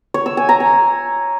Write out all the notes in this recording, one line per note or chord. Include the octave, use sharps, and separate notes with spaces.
C#5
E6
G#5
A#5
G#5